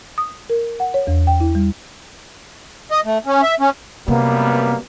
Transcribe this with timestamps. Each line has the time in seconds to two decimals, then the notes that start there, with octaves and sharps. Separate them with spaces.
0.18 D#6
0.50 A#4
0.80 F#5
0.94 C#5
1.07 E2
1.27 G5
1.40 E4
1.55 G3
2.91 D#5
3.05 A3
3.26 C#4
3.42 E5
3.60 C#4
4.08 F#2 C3 G3 A#3 B3